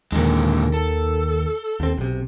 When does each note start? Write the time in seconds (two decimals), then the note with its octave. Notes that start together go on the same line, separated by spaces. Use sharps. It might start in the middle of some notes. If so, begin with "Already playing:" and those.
0.12 D#2 A#2 D3 D#3 G#3
0.74 A4
1.80 D#2 C4
1.97 B1 C3